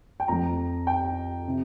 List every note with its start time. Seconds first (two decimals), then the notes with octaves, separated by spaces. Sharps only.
0.20 G5
0.28 F2 F3 A#5
0.87 G5
1.48 C3